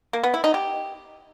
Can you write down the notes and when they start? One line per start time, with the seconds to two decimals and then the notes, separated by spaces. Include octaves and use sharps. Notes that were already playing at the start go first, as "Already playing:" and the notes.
0.13 A#3
0.23 B3
0.34 E4
0.44 D#4
0.54 G4